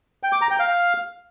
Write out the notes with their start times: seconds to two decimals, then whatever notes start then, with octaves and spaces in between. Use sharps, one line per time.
0.23 G5
0.32 D6
0.41 A#5
0.50 G5
0.59 F5